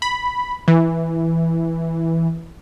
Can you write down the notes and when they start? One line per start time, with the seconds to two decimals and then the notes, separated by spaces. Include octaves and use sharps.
0.02 B5
0.68 E3